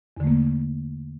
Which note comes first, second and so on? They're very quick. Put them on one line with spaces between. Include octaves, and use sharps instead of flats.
E2 D3 A3 A#3